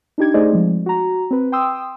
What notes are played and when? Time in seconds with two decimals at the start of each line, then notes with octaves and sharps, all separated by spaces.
0.18 D4 D#4 G4 G#6
0.34 A3 D#4 G#4 C5 D5 D#5
0.51 F3 G#3 C4
0.86 F#4 A#5
1.31 C4 B4
1.52 G5 C6 D#6 E6